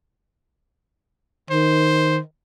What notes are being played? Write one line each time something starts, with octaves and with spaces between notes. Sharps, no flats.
D#3 C5